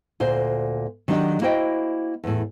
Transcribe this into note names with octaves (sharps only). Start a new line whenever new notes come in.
D2 A#2 C5
D#3 F#3 A#3 D4 G4
A#3 E4 F#4 C5 D#5 G5
E2 A2